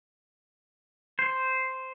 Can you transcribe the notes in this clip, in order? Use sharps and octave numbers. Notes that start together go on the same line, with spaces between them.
C5